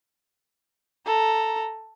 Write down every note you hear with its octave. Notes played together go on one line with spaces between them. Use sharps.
A4 A#5